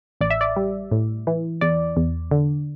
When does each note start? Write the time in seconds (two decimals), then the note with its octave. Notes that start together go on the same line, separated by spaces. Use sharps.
0.21 A1 D5
0.30 E5
0.41 D5
0.56 G3
0.92 A2
1.27 E3
1.61 E2 D5
1.97 E2
2.31 D3